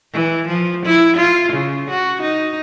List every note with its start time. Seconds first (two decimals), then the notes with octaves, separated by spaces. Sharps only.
0.13 E3
0.47 F3
0.85 E4
1.16 F4
1.53 C#3
1.90 F#4
2.22 D#4